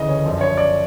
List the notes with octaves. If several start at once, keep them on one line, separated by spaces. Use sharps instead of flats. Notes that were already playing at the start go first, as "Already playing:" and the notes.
Already playing: D2 C#3 E3 D#5
C#5
F#2 D3 F3
C#5
D5